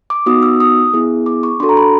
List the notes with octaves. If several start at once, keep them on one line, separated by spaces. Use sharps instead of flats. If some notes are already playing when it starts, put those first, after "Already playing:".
D6
B3 D#4 F#4 D#6
E6
D#6
B3 E4 G#4
D6
C#6
D4 F#4 A4 C6
A#5
B5